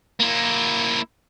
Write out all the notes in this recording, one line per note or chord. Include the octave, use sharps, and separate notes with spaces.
A#3 E4